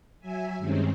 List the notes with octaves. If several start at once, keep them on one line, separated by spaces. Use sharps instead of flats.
F#3 E5 G#5
G2 D#3 G#3 C4 C#4